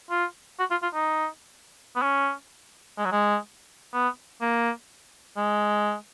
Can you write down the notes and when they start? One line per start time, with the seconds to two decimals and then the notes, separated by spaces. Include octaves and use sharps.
0.10 F4
0.59 F#4
0.71 F4
0.83 F4
0.94 D#4
1.96 B3
2.02 C#4
2.98 G#3
3.05 F#3
3.12 G#3
3.94 B3
4.41 A#3
5.37 G#3